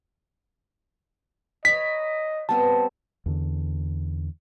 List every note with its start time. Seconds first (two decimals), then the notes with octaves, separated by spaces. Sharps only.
1.65 C#5 D#5 A#5 B5 B6
2.49 G3 B3 C4 A5
3.26 E2 D3